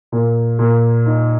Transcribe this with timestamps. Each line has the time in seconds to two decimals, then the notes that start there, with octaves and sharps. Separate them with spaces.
0.12 A#2
0.59 A#2
1.06 D#4